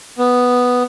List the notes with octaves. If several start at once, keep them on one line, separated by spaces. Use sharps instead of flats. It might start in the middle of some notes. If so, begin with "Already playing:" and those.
B3